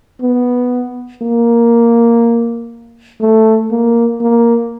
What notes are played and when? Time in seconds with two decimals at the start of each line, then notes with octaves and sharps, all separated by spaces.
0.22 B3
1.22 A#3
3.21 A3
3.71 A#3
4.21 A#3